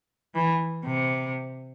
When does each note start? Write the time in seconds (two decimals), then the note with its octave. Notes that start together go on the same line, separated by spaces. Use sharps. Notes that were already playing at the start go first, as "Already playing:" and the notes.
0.35 E3
0.85 C3